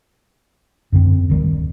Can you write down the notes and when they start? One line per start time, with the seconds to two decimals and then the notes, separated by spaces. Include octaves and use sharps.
0.92 F#2 D3 C4
1.30 D1 D#3 G3